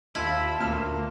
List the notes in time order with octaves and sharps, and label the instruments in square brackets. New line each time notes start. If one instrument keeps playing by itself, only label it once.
[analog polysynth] D#2 F4 B5 [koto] E4 [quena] A5
[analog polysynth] D2 A#3 [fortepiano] A#2 F6